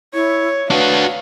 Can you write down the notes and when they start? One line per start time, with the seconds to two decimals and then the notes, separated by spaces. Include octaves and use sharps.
0.14 E4 C#5
0.70 D4 F#4 B4 F5